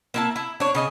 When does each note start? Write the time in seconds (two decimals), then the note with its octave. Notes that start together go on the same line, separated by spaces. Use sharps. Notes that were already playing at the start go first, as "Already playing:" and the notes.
0.14 A#3 E4 A5
0.36 E4
0.60 D4 C#5
0.75 C#3 D#5 G#5